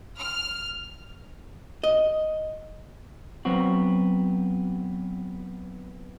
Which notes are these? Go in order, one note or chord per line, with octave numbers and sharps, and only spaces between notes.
F6
D#5
F#3 B3 C4 F#4